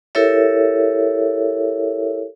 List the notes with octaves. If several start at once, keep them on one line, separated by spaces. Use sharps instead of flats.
E4 G4 A4 A#4 C#5 E5